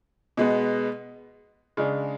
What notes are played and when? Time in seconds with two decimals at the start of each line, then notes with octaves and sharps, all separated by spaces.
0.37 B2 G#3 B3
1.77 C#3 G#3 D4